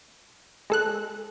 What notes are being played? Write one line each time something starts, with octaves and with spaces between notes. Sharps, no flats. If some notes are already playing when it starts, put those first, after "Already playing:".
G#3 A4 F#6